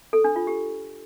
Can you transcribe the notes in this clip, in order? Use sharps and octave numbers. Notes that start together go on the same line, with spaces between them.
A4
D4
F4
G4